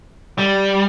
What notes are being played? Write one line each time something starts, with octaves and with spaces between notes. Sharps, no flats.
G3